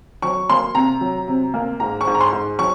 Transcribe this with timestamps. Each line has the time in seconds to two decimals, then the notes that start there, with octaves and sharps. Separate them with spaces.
0.22 F#3 C#6
0.50 A#3 C6
0.75 C3 A#5
1.01 F#3
1.28 C3
1.54 A#3
1.80 G#2 A#5
2.01 C#6
2.07 G#2
2.15 A#5
2.21 C6
2.33 G#2
2.59 F#3 C#6